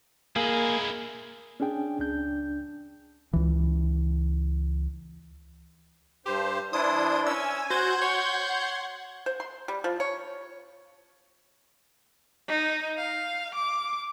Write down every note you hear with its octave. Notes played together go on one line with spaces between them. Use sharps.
G#3 A#3 E4 G#4
C#4 D4 G#4 G5
C#2 D4 G6
C#2 E3
G2 G4 C5
E3 D4 E4 C5 D#6
C#4 G#5 E6
F#4 C5 F#5 G6 G#6
C#5 C6
C5
C6
G3
F3
C#5
D#4
F5
D6